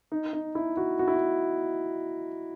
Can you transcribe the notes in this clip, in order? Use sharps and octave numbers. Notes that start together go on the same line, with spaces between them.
D#4
D#4
E4
F#4
F#4
E4
F#4